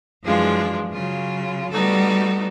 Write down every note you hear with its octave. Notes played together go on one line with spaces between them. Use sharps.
F#2 E3 F3 G#3 D4 F4
C#3 F#3 F4
G3 A3 B3 D#4 F#4 A4